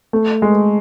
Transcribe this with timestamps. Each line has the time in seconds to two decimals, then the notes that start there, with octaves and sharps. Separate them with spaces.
0.13 A3
0.42 G#3